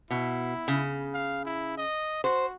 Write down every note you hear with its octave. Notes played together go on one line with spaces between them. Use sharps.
B2 E4
C#3
F5
E4
D#5
F#4 C5